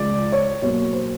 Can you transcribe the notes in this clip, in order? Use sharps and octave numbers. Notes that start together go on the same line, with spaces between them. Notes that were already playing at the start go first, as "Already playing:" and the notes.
Already playing: C#2 C#3 F3 G#3 D5
C#5
B2 F#3 A#3 C#5
C5